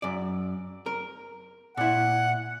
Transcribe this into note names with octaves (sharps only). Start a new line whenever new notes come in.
F#2 D5
A#4
A#2 E4 F#5